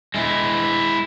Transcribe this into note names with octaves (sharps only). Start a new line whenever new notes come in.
G#3 E4